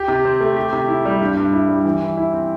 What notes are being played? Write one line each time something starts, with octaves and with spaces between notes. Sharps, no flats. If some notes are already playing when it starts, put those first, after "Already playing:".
Already playing: G4
C3
C4
A3
G4
C3
E4
G3
G2
G2
E4
G3
E3
E3
E4
C4